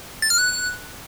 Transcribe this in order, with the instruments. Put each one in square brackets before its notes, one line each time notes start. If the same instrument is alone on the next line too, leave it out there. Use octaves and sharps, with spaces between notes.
[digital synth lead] A6
F6
F#6